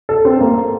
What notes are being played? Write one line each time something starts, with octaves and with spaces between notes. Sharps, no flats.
A4
C4
A#3